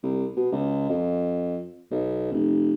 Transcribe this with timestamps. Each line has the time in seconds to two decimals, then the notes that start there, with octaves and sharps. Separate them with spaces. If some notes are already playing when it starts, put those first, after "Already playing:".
0.03 C2
0.36 B2
0.52 C#2
0.89 F2
1.91 B1
2.32 F1